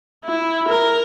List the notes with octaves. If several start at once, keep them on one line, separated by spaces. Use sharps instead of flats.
E4
A#4